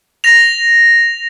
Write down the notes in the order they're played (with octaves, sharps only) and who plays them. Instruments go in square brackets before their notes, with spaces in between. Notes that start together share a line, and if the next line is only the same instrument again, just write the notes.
[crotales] A#6 F7